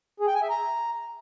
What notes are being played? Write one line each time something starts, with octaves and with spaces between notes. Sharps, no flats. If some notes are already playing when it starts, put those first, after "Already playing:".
G#4
G5
G#5
E5
A#5